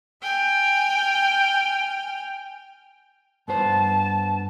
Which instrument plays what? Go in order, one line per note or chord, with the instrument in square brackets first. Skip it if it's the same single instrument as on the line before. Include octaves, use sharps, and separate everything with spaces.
[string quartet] G5 G#5 F6
[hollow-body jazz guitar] G2 B3 C5 [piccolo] A5